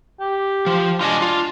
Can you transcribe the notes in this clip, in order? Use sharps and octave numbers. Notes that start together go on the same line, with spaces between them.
G4
F3
D4 F4 D#5 G#5
F4